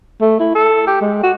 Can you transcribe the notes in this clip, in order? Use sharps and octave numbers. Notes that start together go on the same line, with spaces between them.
A3
E4
A4
G4
G#3
F#4